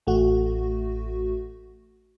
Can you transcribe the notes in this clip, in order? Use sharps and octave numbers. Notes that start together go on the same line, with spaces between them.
A1 A3 F#4